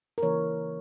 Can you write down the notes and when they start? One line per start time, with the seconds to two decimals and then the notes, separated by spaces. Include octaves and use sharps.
0.18 A#4
0.23 C#3 E3 A#3 C#5